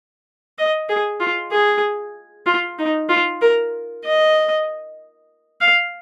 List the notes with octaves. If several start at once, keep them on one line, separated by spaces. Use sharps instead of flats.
D#5
G#4
F4
G#4
F4
D#4
F4
A#4
D#5
F5